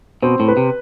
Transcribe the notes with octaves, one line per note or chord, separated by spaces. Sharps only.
B2 C4
A2
B4
C3